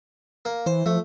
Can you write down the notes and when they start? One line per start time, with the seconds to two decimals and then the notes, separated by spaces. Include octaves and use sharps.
0.45 A#3
0.66 E3 C5
0.86 F3 A3